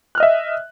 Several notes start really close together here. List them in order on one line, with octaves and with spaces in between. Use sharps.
F#6 F6 D#5 E5